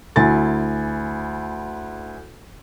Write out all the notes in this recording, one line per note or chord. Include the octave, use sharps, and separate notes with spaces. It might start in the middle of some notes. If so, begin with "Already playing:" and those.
D2 E4 G#5 A6